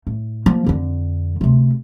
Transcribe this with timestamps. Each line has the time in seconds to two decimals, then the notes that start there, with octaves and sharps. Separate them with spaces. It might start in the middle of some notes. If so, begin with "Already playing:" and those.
0.07 A2
0.46 F3 A#3
0.66 F2 D3
1.41 D2 C3